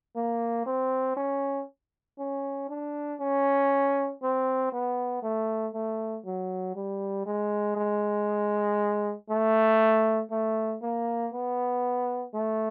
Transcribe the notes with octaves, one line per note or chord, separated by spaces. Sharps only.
A#3
C4
C#4
C#4
D4
C#4
C4
B3
A3
A3
F#3
G3
G#3
G#3
A3
A3
A#3
B3
A3